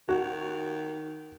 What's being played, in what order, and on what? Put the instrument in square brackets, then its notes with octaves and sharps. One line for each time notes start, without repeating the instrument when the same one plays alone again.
[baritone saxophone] D#3 [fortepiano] F#4